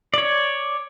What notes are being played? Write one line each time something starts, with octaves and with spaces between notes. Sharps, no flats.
C#5 D5